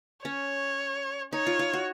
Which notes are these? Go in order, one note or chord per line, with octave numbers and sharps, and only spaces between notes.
C#4 C#5
D#4 C#5
F4
F4
F#4